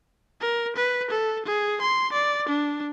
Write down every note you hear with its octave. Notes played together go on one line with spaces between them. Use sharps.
A#4
B4
A4
G#4
C6
D5
D4